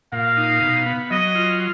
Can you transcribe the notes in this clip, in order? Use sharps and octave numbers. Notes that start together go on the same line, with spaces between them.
A#2 F5
D#4
B2
B3
F#3 D#5
F4